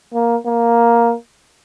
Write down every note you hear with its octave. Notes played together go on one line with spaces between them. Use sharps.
A#3
A#3